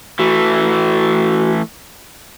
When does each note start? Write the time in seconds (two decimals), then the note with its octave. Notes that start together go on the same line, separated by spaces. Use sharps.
0.19 E3 A3 F#4